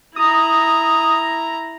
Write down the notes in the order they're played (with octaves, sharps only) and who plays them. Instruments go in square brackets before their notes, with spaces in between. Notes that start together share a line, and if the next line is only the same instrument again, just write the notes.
[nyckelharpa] E4 A#5 [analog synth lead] D#6